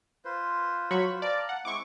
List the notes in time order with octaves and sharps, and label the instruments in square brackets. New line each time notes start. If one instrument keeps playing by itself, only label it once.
[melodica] F4 B4 C5
[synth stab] F#3 B5 C#6
[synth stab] D5 [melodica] F5 A5 A#5
[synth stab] F#5
[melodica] G#3 C4 E4 [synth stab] C#6 D6